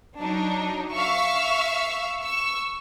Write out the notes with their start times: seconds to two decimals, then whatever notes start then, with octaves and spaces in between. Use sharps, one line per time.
0.19 F#3 D4 D#4
0.95 E5 F5 C#6 E6
2.21 C#6 E6